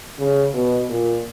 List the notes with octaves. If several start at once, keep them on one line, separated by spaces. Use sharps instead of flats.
C#3
B2
A#2